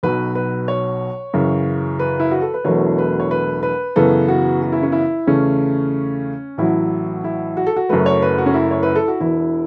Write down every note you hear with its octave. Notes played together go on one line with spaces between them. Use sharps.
B1 B2 F#3 B4
B4
C#5
F#2 C#3 E3
B4
E4
F#4
A4
B4
E1 E2 B2 F#3 A3 C#5
B4
C#5
B4
B4
F#2 C#3 E3 B3 A4
F#4
F#4
E4
C#4
E4
E2 C#3 A3 C#4
A1 A2 F#3 E4
E4
F#4
A4
F#4
F#1 F#2 F#3 A3 B4
C#5
B4
F#4
C#4
E4
C#5
B4
A4
F#4
E1 E2 E3 E4